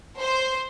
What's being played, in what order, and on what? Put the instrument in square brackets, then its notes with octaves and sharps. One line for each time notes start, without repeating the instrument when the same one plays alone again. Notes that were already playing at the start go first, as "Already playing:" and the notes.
[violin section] C5